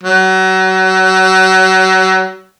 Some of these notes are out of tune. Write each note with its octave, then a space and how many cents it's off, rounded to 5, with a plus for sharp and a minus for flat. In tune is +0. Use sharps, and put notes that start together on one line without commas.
F#3 +30